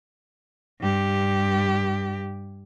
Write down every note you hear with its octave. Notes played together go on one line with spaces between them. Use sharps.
G2 G4